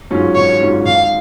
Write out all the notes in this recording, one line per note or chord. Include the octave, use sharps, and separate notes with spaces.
G#2 F#3 C#4 F4
G#1 C#5
G#2 F#3 C#4 F4
G#1 F5